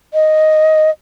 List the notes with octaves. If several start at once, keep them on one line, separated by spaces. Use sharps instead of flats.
D#5